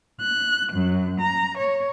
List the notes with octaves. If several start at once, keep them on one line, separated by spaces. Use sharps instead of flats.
F#6
F#2
A#5
C#5